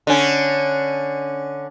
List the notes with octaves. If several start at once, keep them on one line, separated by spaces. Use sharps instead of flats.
D3 C#4